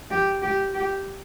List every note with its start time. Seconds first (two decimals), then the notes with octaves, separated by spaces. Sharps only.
0.11 G4
0.42 G4
0.74 G4